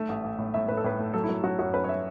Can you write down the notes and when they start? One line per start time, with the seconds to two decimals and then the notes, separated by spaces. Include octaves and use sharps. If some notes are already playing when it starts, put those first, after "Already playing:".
Already playing: A3 E5
0.09 A1
0.24 A1
0.38 A2
0.54 A2 E5
0.68 A2 B4
0.77 A4
0.84 A2 B4
0.99 A3
1.14 F#3 A4
1.24 E4
1.29 F#3
1.43 F#3 F#4
1.59 F#2 F#4
1.74 C#4 B4
1.84 C#5
1.89 E5